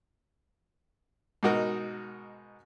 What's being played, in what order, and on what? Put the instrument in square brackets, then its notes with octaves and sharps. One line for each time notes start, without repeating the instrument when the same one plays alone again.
[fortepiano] G#2 B2 D#4 F#4 A#4